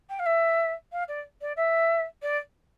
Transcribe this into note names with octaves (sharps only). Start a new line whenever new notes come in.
G5
F5
E5
F5
D5
D5
E5
D5